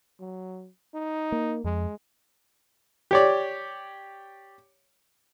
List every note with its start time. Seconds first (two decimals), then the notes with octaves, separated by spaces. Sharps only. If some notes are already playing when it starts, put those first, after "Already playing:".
0.20 F#3
0.94 D#4
1.32 A#3
1.64 F2 G#3
3.11 G4 C#5 D5